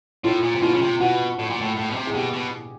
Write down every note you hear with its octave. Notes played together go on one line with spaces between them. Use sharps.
A2 F4
A#2
C3
B2 F4
C#3
C3
B2 F#4
A2
A#2
A2
A2
B2
C3
G#4
B2 G4
B2